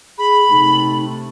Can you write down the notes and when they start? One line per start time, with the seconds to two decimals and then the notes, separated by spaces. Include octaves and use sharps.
0.18 G#4 B5
0.50 C3 A3 D#4